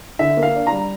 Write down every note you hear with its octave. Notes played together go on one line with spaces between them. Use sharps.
D3 E5
A#3
F5
D4
A#5
G3